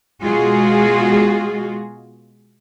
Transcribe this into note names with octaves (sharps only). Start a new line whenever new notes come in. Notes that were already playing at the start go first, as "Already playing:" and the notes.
B2 G#3 F4 F#4 G#4